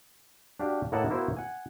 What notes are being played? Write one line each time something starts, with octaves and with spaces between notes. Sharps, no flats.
D4 F#4 G4 F5
A2 A#3 E4 D#5 F#5 A5
A#3 B3 E4 F#4 B4 C5
F#5 G#5